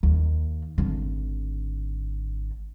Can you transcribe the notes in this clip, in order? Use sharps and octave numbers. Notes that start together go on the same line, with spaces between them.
D#2
G#1 D3